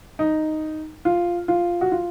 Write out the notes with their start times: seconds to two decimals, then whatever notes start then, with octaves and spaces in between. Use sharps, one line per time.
0.19 D#4
1.05 F4
1.48 F4
1.81 F#4
1.92 F4